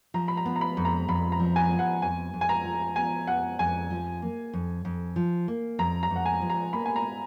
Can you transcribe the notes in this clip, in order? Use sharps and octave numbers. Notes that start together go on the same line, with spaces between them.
F3 A#5
B5
A#5
B3
A#5
B5
F2
A#5
F2 B5
A#5
F3
G#5
B3
F#5
F2 G#5
F2
G#5
A#5
F3
B3 G#5
F2 F#5
F2 G#5
F3
A#3
F2
F2
F3
A#3
F2 A#5
A#5
F2
F#5
G#5
F3
A#5
A#3 B5
G#5
A#5